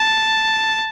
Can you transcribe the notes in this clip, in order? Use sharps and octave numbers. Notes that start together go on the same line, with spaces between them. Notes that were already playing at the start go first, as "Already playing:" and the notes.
Already playing: A5